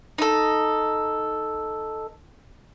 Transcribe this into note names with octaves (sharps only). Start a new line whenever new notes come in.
D#4 A4